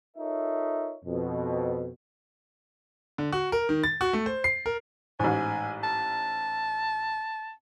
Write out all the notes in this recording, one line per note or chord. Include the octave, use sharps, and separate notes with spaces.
D#4 F4 A4 A#4 C#5 E5
F2 B2
D3
F#4
A#4
D#3
A6
F#4
A3
C5
C7
A#4
A1 G#2 G#5
A5